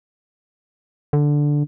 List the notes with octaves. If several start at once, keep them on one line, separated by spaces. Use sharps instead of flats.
D3